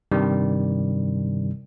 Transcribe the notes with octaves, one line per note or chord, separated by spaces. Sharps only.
G2 C3 D#3 G3